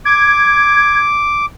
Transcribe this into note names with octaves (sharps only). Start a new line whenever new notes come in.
D6 G#6